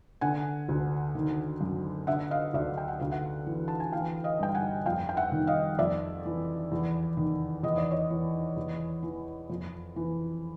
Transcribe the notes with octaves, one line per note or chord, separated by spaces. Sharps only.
D3 F#5 G#5
D2
D#3
F#2
D3 E5 F#5
D#5 F5
D2 D5 E5
G5
F#5
D2 F5
E5 F#5
E3
A5
G#5
E3 F5 G5
D#5 F5
G2 G5
F#5 G#5
F2 F5 G5
G5
E5 F#5
D#3
D#5 F5
F2 D5 E5
E3
E2
D#3
E2 D#5
D5
C#5 D#5
E3
E2
E3
F2
E3